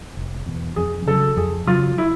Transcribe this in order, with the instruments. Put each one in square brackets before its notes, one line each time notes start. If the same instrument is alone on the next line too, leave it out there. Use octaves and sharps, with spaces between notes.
[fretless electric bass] F1
E2 B2
[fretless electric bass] F2 [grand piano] G#4
[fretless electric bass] C#3 F#3 [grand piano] A4
[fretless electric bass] F2 [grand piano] G#4
[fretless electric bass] C#3 F#3 [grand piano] F4
[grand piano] E4